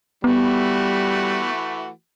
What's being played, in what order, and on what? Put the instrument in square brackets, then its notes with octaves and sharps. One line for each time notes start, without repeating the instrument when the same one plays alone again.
[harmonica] E3 A3 F#4 [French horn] G3 [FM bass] B3